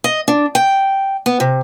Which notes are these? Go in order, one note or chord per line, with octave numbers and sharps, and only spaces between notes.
D#5
D4
G5
B3
C3